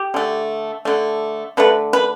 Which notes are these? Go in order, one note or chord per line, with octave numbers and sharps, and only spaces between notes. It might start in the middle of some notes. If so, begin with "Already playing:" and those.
Already playing: G4
D3 A3
D3 A3
D3 A3 B4
B4